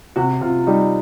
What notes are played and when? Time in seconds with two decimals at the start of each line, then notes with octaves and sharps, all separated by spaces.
0.16 C3 F#4
0.41 C3 F4
0.67 G3 D#4